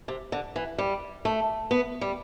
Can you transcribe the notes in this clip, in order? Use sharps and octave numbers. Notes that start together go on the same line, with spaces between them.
C3
D3
E3
G3
A3
B3
G3